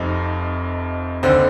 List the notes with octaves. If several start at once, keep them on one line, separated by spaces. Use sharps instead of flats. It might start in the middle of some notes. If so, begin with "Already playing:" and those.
Already playing: F1 F2 C3 D#4
F1 D#2 D3 C4